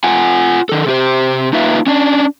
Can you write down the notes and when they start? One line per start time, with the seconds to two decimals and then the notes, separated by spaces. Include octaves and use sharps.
0.04 F4 F#5 G#5
0.69 D#3 A4
0.87 C3 G4 C5
1.53 A#3 D#4 F4 B4 E5
1.87 C#4 D4